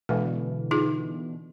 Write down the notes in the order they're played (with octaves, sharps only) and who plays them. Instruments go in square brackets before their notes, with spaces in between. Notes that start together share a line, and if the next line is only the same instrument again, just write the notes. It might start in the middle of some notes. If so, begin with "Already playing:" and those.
[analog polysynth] B2 D3 E3 [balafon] G#3
[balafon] D#4 F4 G#4